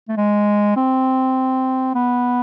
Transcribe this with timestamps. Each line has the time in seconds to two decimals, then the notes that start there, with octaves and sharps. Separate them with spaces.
0.09 A3
0.17 G#3
0.76 C4
1.95 B3